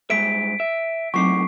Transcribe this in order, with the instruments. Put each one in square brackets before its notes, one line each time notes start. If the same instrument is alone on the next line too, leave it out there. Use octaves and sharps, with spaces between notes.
[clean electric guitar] G2 G#3 E5 [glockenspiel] B6 D7
[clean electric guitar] E5
[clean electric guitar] C#2 A2 D#4 [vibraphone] F#3 C4 D6 [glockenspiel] C#6 C7